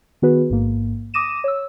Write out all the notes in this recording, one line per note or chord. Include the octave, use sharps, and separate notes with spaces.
D#3 B3 F#4 G#4 B4
A1 G#2 A#3
D6 D#6 A#6 D#7 E7
C#5 E6